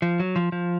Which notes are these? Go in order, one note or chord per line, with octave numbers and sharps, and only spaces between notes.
F3
F#3
F3
F3